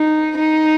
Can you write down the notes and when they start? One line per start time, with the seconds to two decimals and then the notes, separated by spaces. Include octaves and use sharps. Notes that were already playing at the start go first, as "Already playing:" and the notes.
Already playing: D#4
0.37 D#4